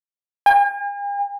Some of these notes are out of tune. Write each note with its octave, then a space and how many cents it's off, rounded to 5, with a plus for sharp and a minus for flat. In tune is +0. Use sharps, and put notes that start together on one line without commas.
G#5 -45